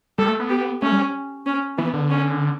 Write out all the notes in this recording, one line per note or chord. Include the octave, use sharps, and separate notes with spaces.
G3 A4
A3
B3
G4
A3 C#4
G3
C#4
E3 B3
D3
C#4